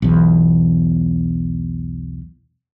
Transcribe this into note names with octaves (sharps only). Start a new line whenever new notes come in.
B1 E2